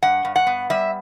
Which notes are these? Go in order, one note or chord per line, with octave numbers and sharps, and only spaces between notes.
G2 F#5
G2
F#5
B3
G3 E5